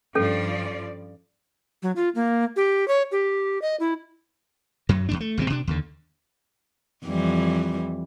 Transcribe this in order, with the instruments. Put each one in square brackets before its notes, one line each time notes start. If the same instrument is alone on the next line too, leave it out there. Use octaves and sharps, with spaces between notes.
[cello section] G2 F3 D5 [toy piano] C#4 A4
[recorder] F#3
F4
A#3
G4
C#5
G4
D#5
E4
[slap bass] F#2 F#3
E2 A2 D4
A3
G#1 C3 G#3 C4
B2 D4
D#2 D3
[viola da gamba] F2 E3 G3